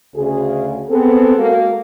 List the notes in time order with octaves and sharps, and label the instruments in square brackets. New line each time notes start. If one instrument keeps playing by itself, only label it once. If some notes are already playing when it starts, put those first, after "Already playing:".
[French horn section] D2 C#3 G#4
[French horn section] B3 C4 G#4 [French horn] A4
[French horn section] G#3 A#3 F#4